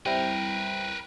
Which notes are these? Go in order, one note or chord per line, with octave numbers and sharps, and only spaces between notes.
G3 C4 E4 A#4 B4 G5